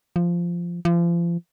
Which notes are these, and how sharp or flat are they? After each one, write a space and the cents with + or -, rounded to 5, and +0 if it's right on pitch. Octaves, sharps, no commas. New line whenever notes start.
F3 -10
F3 -35